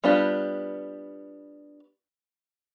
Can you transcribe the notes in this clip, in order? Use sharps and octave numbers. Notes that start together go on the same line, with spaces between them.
G3 B3 D4 F4 G4